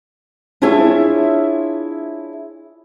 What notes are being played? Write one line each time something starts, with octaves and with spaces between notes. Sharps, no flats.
D4 E4 F4 G#4 C#5 E5